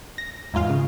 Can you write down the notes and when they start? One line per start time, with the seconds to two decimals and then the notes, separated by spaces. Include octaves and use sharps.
0.18 A#6
0.54 E2 G#2 F4 F5
0.70 C#3